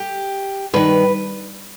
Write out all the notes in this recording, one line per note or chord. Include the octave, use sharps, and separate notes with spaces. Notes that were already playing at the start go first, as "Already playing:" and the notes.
Already playing: G4
G2 D#3 B4